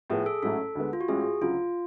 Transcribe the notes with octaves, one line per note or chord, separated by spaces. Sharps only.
A2 F3 B3 G#4
A4
A1 G#2 F#3 A3 C#4 A4
D2 D3 G#3 B3
F4
F#4
A1 A2 G#3 C#4 G#4
D2 C#3 F#3 F4